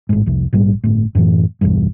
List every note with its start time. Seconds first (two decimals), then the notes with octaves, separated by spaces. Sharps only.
0.09 A1 G#2
0.26 C2 F2
0.53 A#1 G#2 G3
0.84 G1 A2
1.15 F#2 A2 C3 E3
1.61 B1 E2 G2